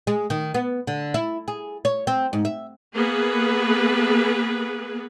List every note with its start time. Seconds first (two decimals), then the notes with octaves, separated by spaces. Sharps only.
0.07 G#3
0.30 D#3
0.54 B3
0.87 D3
1.14 E4
1.48 G#4
1.85 C#5
2.07 C4
2.33 G#2
2.45 E5
2.95 A#3 B3 G#4 B4